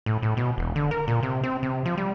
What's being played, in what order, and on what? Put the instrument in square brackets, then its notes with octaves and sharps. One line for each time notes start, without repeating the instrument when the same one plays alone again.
[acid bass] A2
A2
B2
E1
D3
A#4
A#2
C3
C4
C3
F3
G3